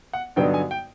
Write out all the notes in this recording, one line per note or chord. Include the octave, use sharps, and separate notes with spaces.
F#5
G2 D3 F#3 B3 D#4 G5
G#5
G5